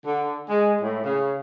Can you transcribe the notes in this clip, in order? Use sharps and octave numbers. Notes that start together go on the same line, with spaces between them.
D3
G#3
A2
C#3